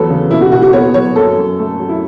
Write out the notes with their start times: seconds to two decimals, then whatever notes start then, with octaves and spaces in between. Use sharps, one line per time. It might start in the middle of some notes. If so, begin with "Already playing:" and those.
Already playing: E2 F#3 A3 A4 B4
0.10 C#3
0.31 B2 E4
0.41 F#4
0.52 B2 F#4
0.62 F#4
0.73 B3 C#5
0.94 F#3 C#5
1.16 F#2 A4
1.37 F#2
1.59 A3
1.79 F#3
1.89 E4